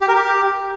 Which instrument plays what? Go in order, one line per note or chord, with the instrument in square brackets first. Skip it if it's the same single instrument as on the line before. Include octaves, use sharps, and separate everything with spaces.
[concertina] G4
A#4
G4